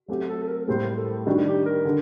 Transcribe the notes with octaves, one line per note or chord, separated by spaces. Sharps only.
F#3 A3 C4 F#4 G4
A4
A4
A#4
A2 G3 A#3 C5
A4
D#3 G3 D4 F#4
G4
A#4
D3